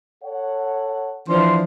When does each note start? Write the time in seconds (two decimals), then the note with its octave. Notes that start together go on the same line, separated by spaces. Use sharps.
0.24 A4 C#5 F#5
1.28 E3 F3 D4 C6